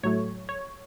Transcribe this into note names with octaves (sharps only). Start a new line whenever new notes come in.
A2 F#3 A3 C#5
C#5